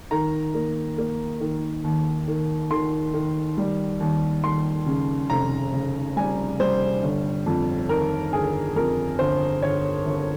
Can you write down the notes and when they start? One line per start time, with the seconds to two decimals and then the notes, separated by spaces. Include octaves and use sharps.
0.11 D#3 A#5
0.54 A#3
0.98 A#3
1.40 D#3
1.84 D#2
2.28 D#3
2.71 D#3 C6
3.14 D#3
3.57 G3
4.00 D#2
4.44 D#2 C6
4.86 C#3
5.30 F1 A#5
5.73 C#3
6.17 G3 G#5
6.60 G3 C5
7.03 G1
7.46 F2
7.89 D#3 A#4
8.33 G1 G#4
8.76 F2 A#4
9.19 G1 C5
9.62 G1 C#5
10.06 G1